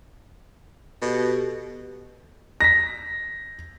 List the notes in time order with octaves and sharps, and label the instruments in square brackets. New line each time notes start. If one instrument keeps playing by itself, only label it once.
[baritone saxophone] B2 [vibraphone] G4 A4
[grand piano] A#6 B6